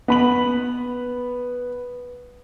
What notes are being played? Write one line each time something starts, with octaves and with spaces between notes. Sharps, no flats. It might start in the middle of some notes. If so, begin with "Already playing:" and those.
B3 B5 F#7